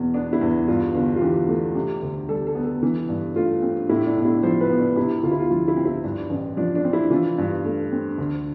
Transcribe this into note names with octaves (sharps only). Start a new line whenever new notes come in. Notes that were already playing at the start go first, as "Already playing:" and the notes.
Already playing: E2 B2
B3 D4
E4
E2
G2 F4
G1
F4
E3 G4
A3
C3
D2
G3 A4
A4
B3
A4
E3
G2
A3 F4
C4
A2 E4
D4
B1
E4
F3 C5
B4
B3
D4
C3 E4
D2 F4
E4
F4
F3 F4
E4
C4
E4
G2 D4
A1
F3 D4
D4
C4
E4
E3 F4
G2
A3
C4
D2